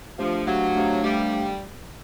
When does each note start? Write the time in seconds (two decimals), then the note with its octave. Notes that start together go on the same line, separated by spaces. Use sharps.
0.18 F3 A3 D4 G4 C5 F5
0.46 F#3 A3 D4 G4 C5 F5
0.75 A3 D4 G4 C5 F5
1.03 G3 A3 D4 G4 C5 F5